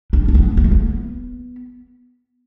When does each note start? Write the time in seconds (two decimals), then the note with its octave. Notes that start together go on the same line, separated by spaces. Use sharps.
0.13 D4
0.28 D4
0.35 B3
0.57 B3
0.64 A3
0.71 B3